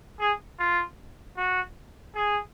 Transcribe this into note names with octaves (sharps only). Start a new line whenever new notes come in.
G#4
F4
F#4
G#4